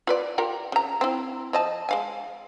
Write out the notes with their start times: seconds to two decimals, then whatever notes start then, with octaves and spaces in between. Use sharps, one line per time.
0.07 F4 B4 D5
0.38 F4 G4 A#4
0.72 C#3 A#5
1.01 C4 E4
1.53 F3 D#5 A5
1.89 G#3 F5 G#5